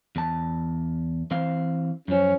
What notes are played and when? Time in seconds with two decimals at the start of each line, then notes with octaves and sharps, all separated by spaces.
0.16 E2 A5
1.31 E3 C4 F5
2.08 F#2 F3 C#4